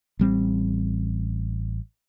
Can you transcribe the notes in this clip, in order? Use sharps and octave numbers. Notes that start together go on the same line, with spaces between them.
A1 G3 C4